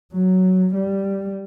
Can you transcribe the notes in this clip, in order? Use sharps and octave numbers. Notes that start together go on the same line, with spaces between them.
F#3
G3